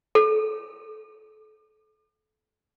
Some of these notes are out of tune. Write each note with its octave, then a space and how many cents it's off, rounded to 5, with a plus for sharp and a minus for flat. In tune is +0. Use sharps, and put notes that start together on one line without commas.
A4 -30